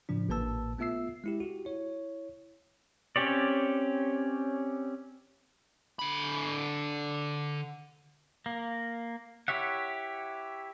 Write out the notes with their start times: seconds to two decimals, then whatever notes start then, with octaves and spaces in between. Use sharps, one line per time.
0.09 A2 C#3 F3 D4
0.29 A1 A#2 A#3 B4 A5 E6
0.78 A3 B3 F4 E5 E6 C7
1.24 G#3 E4 G4
1.40 F#4 G4
1.65 E4 C#5
3.16 C4 C#4 G4 C#5 D5
5.99 D3 B5
8.46 A#3
9.48 E4 G4 C#5 E5 F#5